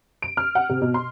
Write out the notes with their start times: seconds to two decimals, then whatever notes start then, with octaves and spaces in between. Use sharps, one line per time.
0.22 D7
0.37 F6
0.55 F#5
0.69 C3
0.81 B2
0.94 C6